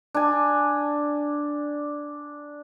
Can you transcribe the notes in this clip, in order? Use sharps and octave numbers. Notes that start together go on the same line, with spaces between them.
D4 G#5